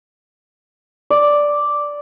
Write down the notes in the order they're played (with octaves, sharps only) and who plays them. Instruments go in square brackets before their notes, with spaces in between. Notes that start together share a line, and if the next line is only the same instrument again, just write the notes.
[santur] D5